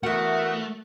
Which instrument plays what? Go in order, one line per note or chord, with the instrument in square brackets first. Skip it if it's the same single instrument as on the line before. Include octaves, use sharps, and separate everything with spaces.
[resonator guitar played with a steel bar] E2 F#5 [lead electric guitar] A3 [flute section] F#4 E5 D#6 [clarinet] A#4